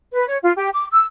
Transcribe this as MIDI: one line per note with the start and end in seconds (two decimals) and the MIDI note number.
0.13 0.26 71
0.27 0.37 73
0.42 0.52 65
0.56 0.69 67
0.74 0.85 86
0.91 1.04 88